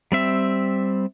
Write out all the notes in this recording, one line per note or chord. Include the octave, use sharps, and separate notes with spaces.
G3 C4 E5